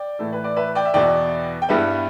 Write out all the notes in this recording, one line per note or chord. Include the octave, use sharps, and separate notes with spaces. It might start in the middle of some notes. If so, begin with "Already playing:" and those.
Already playing: D5 G5
A2 E3 A3 E4
B4
D5
B4 E5
D5 G5
E5
E2 B2 B3 E4 D5 G5
G5
G2 G3 B3 E4 B4 E5